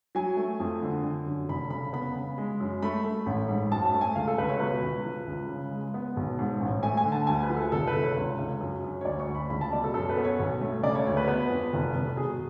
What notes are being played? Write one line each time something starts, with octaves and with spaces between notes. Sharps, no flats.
F#3 G#5
A3
F2
D3
D3
F#2
F1 B5
C#3 B5
B3 B5
C#3
G#3
F#2
A3 B5
A3
A1
G#2
F#2 A5
A5
A3
G#5
C#2 F5
A4
C#2 B4
C#5
B2 B4
C#2
F3
C#2
C#3
G#3
B3
B1
G#2
A1
A3 G#5
G#5
D3
A5
D2 G#5
B4
F3
A4
F1 A4
B4
F1
C#5
C#2
C#2
F#2
F#2
C#5
D2 D5
C#6
D2
B5
C#2 B5
A5
B2 D5
A4
F#2 A4
B4
B3
C#5
B1
A3
C#3 D5
C#5
D2 C#5
B4
B3 B4
F2
F1
F1
B2 G#4